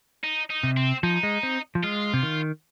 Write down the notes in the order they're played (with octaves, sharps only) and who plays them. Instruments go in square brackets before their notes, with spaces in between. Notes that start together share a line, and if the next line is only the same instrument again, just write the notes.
[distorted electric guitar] D#4
D#4
[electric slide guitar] C3
[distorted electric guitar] C4
[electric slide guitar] F3 [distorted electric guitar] D#4
[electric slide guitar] G#3
C4
F3
[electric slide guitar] G#3 [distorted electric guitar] F4
[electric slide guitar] C3
D#3